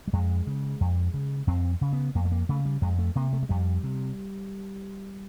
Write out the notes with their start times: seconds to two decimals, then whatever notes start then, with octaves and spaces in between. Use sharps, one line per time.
0.07 G3
0.13 F2 G#3
0.47 C#3
0.81 F2
1.14 C#3
1.47 F2 C4
1.81 C#3
1.93 B3
2.15 F2 A#3
2.25 A3
2.32 A#3
2.49 C#3 A3
2.65 G3
2.82 F2 G#3
2.99 A3
3.15 C3 A#3
3.33 A3
3.43 G#3
3.49 F2 G3
3.83 C3